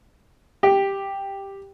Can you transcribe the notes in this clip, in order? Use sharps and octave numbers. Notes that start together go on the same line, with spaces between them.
G4